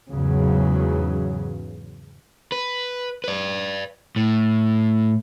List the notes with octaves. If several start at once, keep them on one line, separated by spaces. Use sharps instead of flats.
E2 G#2 C#3 F#3
B4
B4 D5
A2